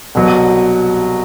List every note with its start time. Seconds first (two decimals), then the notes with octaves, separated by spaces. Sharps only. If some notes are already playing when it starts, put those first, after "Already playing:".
0.15 C2 B2 F#3